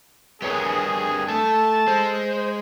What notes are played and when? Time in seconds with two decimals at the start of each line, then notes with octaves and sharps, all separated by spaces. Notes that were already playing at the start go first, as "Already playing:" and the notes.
0.42 G2 G4 G#4 A#4 B4 C#5
1.28 A3 A4 A5
1.88 G#3 C5